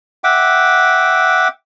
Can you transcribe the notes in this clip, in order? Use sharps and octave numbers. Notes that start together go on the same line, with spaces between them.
E5 F#5 G5 D6